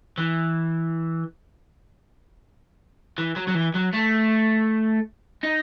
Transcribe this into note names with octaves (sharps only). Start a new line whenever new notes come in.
E3
E3
F#3
F#3
E3
F#3
A3
D#4